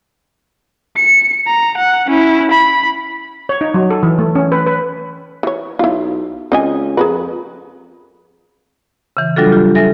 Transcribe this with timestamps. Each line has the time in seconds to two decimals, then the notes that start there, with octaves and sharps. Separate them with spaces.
0.96 C#7
1.46 A#5
1.77 F#5
2.07 C#4 E4
2.51 B5
3.49 C#5
3.61 D#4
3.74 F#3
3.90 A4
4.03 E3
4.19 A3
4.35 C#4
4.52 B4
4.66 B4
5.43 E3 C#5
5.79 B1 E4 F4
6.52 C#2 C4 D#5 G#5
6.97 F2 G#4 A#4 B4
9.17 C#3 E3
9.36 F#3 G3 D4 F4 F#4 A4
9.52 F4 G4
9.75 A4 E5 G#5 A#6